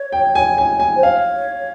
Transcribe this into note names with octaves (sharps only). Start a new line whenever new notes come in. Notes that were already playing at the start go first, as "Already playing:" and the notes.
Already playing: C#5
G5
G#5
G#5
G#5
C5
C#5 F5